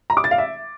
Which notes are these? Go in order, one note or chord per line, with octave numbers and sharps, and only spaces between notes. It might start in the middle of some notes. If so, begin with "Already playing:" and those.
A#5
D6
A6
F5
E5